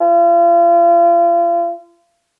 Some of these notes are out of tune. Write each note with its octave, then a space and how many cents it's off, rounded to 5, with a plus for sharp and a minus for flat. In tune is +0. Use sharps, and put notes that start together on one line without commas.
F4 -35